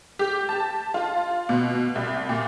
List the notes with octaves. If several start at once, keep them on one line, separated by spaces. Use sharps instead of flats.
G4
A5
F4
B2
C2
A#2